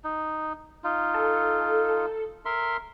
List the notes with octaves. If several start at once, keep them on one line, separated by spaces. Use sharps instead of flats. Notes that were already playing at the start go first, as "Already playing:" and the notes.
D#4
D#4 F4
A4
A#4 E5 C6